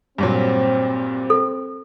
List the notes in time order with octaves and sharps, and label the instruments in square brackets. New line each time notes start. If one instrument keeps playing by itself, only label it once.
[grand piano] G2 A#2 F#3 [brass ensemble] C4
[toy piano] A4